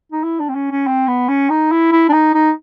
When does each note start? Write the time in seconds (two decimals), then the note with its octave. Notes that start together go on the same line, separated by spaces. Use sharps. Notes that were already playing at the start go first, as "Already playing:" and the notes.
0.12 D#4
0.24 E4
0.40 D4
0.49 C4
0.55 C#4
0.71 C#4
0.87 C4
1.08 B3
1.29 C#4
1.50 D#4
1.71 E4
1.92 E4
2.09 D4
2.13 D#4
2.34 D#4